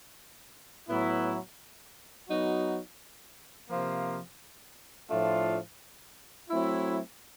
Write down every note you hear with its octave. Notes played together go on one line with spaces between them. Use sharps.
A2 F#3 B3 E4
F#3 B3 D#4 F#4
C3 F3 A#3
A2 F3 A3 D4 F4
F#3 A3 C4 E4